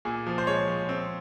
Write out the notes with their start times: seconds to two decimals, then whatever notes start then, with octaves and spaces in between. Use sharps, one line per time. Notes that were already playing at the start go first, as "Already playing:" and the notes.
0.05 A#2 G#4
0.26 F3
0.38 C5
0.47 G#3 C#5
0.68 F3
0.89 C4